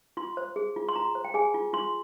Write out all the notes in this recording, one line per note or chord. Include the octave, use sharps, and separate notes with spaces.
F4 C6
C5
G#4
F4
C6
F4 A#5
C5
G5
G#4 G#5
F4
F4 C6